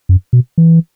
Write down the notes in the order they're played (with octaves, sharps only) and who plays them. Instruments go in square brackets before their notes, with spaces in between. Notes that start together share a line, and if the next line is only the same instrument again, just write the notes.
[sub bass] F#2
B2
E3